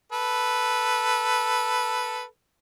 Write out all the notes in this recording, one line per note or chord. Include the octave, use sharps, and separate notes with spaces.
A4 B4